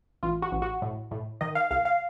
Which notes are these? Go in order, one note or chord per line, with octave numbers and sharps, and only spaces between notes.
A1 F4
F#4
A1
F#4
A2
A2
D#3 D#5
F5
C2 F5
F5